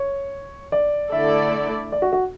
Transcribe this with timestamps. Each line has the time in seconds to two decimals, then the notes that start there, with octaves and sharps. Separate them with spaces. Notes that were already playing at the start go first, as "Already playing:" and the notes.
Already playing: C#5
0.72 D5
1.12 D3 A3 E4 A4 D5 E5
1.92 D5
2.02 F#4
2.13 F#4